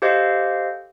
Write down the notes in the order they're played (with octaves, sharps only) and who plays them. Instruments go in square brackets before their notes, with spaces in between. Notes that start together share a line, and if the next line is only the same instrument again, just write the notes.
[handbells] G4 A4 C5 D#5 F5